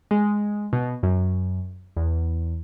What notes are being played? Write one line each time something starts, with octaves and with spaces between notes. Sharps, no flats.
G#3
B2
F#2
E2